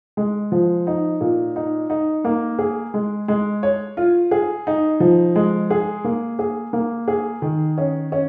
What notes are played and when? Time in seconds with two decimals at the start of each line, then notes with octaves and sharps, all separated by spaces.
0.17 G#3
0.52 F3
0.87 D#4
1.21 A#2
1.56 D#4
1.90 D#4
2.25 A#3
2.59 G#4
2.94 G#3
3.28 G#3
3.63 C#5
3.97 F4
4.31 G#4
4.67 D#4
5.00 F3
5.36 G#3
5.70 G#4
6.04 A#3
6.39 G#4
6.73 A#3
7.08 G#4
7.42 D#3
7.78 C#4
8.12 C#4